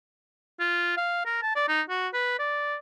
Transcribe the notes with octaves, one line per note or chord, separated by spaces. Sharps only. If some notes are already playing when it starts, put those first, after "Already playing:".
F4
F5
A#4
A5
D5
D#4
F#4
B4
D5